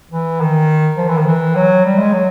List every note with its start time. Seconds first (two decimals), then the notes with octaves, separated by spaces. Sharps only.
0.11 E3
0.41 D#3
0.98 F3
1.08 E3
1.17 D#3
1.27 E3
1.56 F#3
1.85 G3
1.99 G#3
2.14 F#3